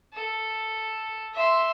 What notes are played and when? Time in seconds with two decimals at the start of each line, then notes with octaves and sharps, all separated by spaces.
0.14 A4
1.34 E5 C6